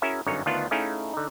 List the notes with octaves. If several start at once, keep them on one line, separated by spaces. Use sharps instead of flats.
C#4 E4 F#4 G#4 A#4 E5
G1 F#2 D3 D#4 C#5
D2 D#3 B3 D4 F4 F#5
A3 C#4 D#4 E4 G#4 F5
D3 D#4